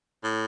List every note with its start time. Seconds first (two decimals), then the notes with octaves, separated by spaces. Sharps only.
0.24 A2